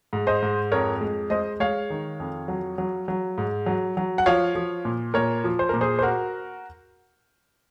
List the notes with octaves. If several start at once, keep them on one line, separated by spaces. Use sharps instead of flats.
G#2
C5 D#5
G#2
F2 A#4 C#5
G#3
G#3 C5 D#5
G#3 C#5 F5
D#3
F2
F#3
F#3
F#3
G#2
F#3
F#3
F#5
F3 C#5 F5
F3
A#2
A#2 A#4 C#5
F3
C5
A#2 A#4
G#4 C5
C5
F#4 A#4